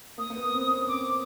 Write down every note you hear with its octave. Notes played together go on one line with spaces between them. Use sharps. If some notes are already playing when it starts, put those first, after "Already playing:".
A#3 D#6
A#3
B3
C4
C#4
C4 D6